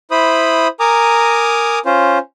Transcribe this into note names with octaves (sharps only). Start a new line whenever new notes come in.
E4 C5 B5 D#6
A#4 G#5 A#5 D6 D#6
C#4 F4 C5